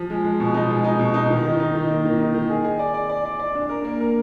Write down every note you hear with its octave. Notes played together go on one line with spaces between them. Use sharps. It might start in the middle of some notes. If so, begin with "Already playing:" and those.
Already playing: F3
G#3
G#3
B2
D#4
G#3
D#4
B2
D#4
D#3
D#3
D#4
D#3
A#3
D#3
D#4
D#3
G#4
G#4
D5
D5
D5
D5
D5
D4
A#4
A#3
A#4